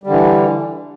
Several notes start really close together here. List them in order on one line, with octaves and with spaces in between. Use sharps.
G3 D3 E3